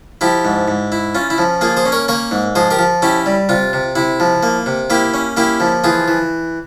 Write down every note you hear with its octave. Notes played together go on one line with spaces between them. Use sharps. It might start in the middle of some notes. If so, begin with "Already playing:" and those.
F3 E4 G4
G#2
G#2
E4
C#4 F4
E4
F3
A#3 F4 G#4
G#4 C5
C#4
A#4 C#5
A#3 A#4 C#5
G#2
F3 G#4 C5
G4 A#4
F3
C#4 E4 G4
G3
C3 F4
C3
C3 E4
F3
A#3
C3
A#3 E4 G4
C#4
A#3 E4 G4
F3
E3 F4 G#4
E3